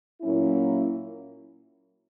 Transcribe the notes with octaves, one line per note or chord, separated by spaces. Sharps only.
A#2 F#3 A#3 C#4 E4